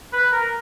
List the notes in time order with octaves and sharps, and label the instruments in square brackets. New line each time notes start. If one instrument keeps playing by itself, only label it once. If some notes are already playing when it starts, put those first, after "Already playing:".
[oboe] B4
A#4